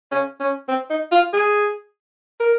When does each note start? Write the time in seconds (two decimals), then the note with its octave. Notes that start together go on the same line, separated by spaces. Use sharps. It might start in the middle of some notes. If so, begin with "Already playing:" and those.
0.11 C#4
0.40 C#4
0.69 C4
0.90 D#4
1.12 F4
1.33 G#4
2.40 A#4